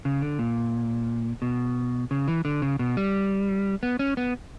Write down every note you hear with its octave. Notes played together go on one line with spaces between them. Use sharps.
C#3
D3
A#2
B2
C#3
E3
D3
C#3
B2
G3
B3
C#4
B3